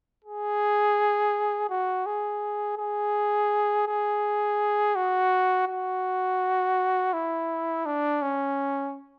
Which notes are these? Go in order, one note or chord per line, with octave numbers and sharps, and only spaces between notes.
G#4
F#4
G#4
G#4
G#4
F#4
F#4
E4
D4
C#4